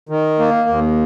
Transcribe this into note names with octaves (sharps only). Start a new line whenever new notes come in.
D#3
A#3
D#2